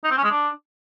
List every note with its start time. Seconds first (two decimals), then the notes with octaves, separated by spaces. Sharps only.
0.04 D#4
0.11 C4
0.18 C#4
0.24 G#3
0.31 D4